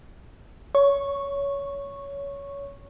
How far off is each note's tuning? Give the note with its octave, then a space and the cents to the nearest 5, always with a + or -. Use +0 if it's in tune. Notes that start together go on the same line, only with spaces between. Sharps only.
C#5 +20 C#6 -10